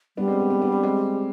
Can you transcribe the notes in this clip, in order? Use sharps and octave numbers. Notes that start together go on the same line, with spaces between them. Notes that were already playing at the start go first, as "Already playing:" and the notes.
G3 B3 D4
G#3 C4
B3
B3
B3 D4
B3
G#3 C4